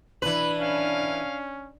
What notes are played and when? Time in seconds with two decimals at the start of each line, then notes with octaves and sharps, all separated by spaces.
0.22 E3 D4 B4 F#7
0.60 C#4 F5